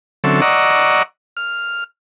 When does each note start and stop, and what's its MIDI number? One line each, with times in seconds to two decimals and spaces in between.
0.24 0.41 50
0.24 0.41 54
0.24 0.41 60
0.24 0.41 61
0.24 0.41 69
0.24 0.41 76
0.42 1.03 74
0.42 1.03 75
0.42 1.03 78
0.42 1.03 82
0.42 1.03 85
0.42 1.03 88
1.37 1.84 89